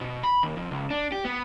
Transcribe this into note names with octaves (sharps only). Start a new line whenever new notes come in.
B2
B5
D#2
F2
C#2
D4
G4
B3